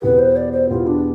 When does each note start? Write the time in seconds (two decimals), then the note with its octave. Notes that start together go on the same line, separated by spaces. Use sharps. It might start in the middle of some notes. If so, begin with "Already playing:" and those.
0.02 E2 B2 B3 E4 G4 B4
0.19 C5
0.36 D5
0.52 C5
0.69 E2 B2 B3 E4 F4 G4
0.87 D4